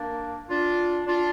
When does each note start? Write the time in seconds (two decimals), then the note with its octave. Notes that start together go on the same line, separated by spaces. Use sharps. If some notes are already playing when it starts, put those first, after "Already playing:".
Already playing: A#3 D4
0.49 D4 F4
1.07 D4 F4